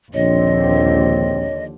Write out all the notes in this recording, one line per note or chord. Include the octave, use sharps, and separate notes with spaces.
A#1 D#2 D3 F3 C4 C#5 D#5